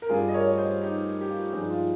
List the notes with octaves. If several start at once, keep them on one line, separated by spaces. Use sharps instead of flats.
A#4
G2 G3 F4 G#4
D#5
A#4 C#5
C5 D#5
D#4 G4
G4
F4
G2 F3 G#3 D#4
F4